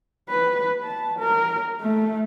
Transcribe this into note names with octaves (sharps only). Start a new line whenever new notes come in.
B4
A5
A#4
A3